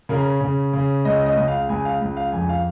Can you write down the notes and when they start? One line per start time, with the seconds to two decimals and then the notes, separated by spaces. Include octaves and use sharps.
0.09 C#3 A#4
0.41 C#3
0.73 C#3
1.05 C#2 D#5
1.26 D#5
1.37 C#2
1.48 F5
1.69 C#2 G#5
1.85 F5
2.01 C#2
2.17 F5
2.32 F2 G#5
2.49 F5